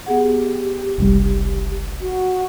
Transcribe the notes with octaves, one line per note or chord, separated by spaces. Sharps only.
B3 G4 G#4 F#5
F#1 C2 G3
F#4